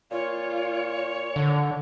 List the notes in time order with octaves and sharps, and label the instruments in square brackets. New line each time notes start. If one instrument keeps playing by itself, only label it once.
[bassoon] A#2 [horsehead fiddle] F4 [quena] C#5
[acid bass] D3 [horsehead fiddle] D4